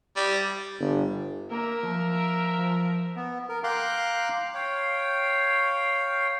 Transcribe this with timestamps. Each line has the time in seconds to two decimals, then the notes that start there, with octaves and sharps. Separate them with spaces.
0.16 G3
0.79 G1
1.51 A#3 A#4 E5
1.83 F3
2.59 F3
3.16 B3
3.49 A#4
3.64 F5 G5 A#5 C6 D6 F#6
4.54 C#5 F5 G5